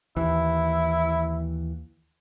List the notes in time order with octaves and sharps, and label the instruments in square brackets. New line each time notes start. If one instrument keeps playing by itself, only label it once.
[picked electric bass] D#2 E3 [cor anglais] E4